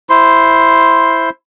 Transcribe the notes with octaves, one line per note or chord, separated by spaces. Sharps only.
E4 C5 C6